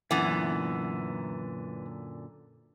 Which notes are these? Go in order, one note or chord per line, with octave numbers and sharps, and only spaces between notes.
F#2 A#2 D3 E3 B3